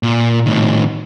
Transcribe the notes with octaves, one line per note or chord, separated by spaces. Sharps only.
A#2
A2 D#3